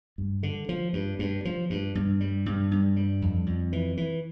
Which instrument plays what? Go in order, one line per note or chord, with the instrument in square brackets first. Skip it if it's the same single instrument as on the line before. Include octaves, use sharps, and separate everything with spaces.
[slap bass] G2
D3
F3
G2
G2
F3
G2
G2
G3
G2
G2
G3
F2
F2
E3
E3